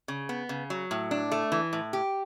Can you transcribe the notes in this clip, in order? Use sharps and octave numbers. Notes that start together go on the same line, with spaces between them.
C#3
B3
C#3
F#3
A2
D4
A3
E3
A2
G4